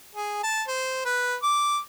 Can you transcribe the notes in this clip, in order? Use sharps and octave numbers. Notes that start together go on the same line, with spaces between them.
G#4
A5
C5
B4
D6